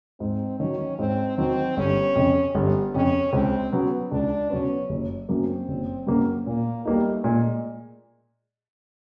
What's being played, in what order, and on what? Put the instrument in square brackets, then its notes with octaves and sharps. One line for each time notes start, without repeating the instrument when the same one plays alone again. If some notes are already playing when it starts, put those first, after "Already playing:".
[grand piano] G#2 [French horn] C4
[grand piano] D#3 F#3 [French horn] C#4
[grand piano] G#2 [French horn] C4
[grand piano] D#3 F#3 [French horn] C4
[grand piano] G1 [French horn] C#4
[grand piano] F2 C#3
G1
[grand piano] F2 C#3 [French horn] C#4
[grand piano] C#2 [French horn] C4
[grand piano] C#3 F#3 B3
[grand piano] C#2 [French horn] D4
[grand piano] C#3 F#3 B3 [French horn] C#4
[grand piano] F#1
[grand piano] F#2 C#3 F#3 A#3 [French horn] C4
[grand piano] F#1
F#2 C#3 F#3 A#3
[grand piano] A#2 [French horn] A#3
[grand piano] G3 A#3 D#4 [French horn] A3
[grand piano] A#2 [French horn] G#3